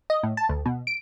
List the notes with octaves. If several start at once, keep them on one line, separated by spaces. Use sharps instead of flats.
D#5
A2
A5
D2
B2
D7